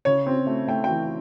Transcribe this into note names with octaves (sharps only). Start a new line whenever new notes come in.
C#3 C#5
C4
A3
A3 G5
G5
E3